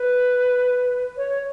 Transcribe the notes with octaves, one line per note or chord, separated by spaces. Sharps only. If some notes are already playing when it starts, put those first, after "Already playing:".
Already playing: B4
C#5